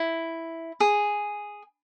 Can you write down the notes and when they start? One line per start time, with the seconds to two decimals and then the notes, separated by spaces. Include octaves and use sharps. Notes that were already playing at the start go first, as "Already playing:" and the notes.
Already playing: E4
0.80 G#4